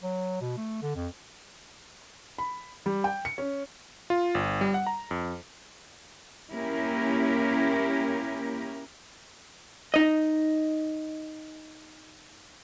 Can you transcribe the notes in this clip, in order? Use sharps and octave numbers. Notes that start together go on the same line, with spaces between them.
F#3
B2
A3
D3
F2
B5
G3
G5
C#7
C#4
F4
G1
G3
F#5
A#5
F2
A#3 C#4 E4 G4 A#4
D#4 D#5